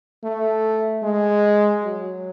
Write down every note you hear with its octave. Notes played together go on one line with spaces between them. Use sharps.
A3
G#3
F#3